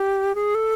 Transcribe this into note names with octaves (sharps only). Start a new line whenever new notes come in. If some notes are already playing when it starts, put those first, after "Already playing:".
Already playing: G4
G#4
A4